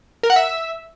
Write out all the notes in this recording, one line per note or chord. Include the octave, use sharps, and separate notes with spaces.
A#4
F#5
E5